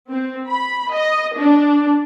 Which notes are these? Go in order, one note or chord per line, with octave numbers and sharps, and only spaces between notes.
C4
B5
D#5
D4